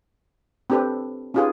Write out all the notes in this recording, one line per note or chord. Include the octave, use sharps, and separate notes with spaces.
C4 D4 G4 A4 B4
C#4 D#4 F4 G4 G#4 B4